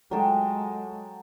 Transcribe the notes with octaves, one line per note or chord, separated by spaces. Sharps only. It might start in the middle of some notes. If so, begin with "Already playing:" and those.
F#3 G#3 A4 G5